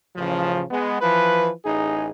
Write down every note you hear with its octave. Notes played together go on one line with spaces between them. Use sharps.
A1 C#3 F3
G#3 B3
E3 F3 B4
A1 D#4 G#4